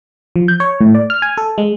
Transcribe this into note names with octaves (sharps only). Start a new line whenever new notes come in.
F3
G6
C#5
A2
D5
F6
G#5
A4
G#3